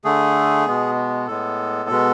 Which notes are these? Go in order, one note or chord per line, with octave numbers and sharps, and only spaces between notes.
D3 A3 G#4
B2 G#3 B3
A2 G#3 B3 A4
B2 G#3 B3